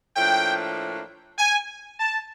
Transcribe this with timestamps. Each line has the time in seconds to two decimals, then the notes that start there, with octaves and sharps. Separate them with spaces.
0.16 A2 F3 A#3 D4 G5
1.38 G#5
2.00 A5